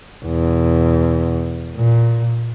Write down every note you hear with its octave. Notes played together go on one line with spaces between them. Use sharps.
E2 B2
A#2